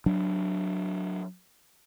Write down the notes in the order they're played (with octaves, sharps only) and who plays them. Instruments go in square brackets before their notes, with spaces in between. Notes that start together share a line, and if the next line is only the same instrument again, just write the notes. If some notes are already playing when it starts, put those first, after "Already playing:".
[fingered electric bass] F#3 D4